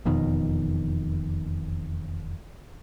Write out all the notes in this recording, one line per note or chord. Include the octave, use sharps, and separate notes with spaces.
E1 F2 B2 D#3